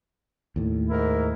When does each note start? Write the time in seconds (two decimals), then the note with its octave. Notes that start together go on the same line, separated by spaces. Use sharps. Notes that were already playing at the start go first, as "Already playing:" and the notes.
0.56 D#2 A2
0.89 G#2 E4 A#4